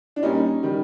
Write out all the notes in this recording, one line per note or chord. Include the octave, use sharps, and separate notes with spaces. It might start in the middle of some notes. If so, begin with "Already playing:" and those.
D4
A#2 G3 C#4 D#4
D#3 G3